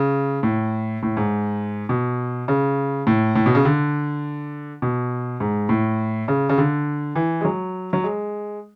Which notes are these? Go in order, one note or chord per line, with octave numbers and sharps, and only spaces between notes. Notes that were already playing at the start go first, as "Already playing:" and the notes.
Already playing: C#3
A2
A2
G#2
B2
C#3
A2
A2
B2
C#3
D3
B2
G#2
A2
C#3
C#3
D3
E3
G#3
F#3
F#3
G#3